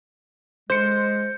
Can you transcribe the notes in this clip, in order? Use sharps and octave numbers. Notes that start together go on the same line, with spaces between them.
G#3 C5 G6 C#7